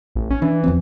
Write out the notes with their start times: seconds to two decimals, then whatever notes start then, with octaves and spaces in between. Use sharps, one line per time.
0.16 A1
0.30 C#4
0.42 E3 D4
0.64 E2 F3 C4